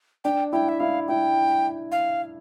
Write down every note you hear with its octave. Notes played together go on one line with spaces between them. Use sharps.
D4 G5
E4 G5
E5
E4 F5
E4 G5
F5